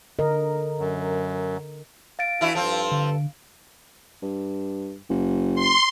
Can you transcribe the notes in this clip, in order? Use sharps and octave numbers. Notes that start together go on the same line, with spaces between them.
D3 A#4 D#5
F#2
F5 A6 D7
E3 D4 E4 F#4
G2 F3 C4 A4 A5
D3
G2
F#1
C6